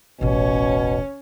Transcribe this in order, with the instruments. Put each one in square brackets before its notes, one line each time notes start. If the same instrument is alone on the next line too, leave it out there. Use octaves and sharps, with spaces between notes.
[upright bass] E1 A1 [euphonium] B2 [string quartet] C#4 C#5